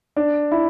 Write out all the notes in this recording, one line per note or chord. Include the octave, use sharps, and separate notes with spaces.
D4
E4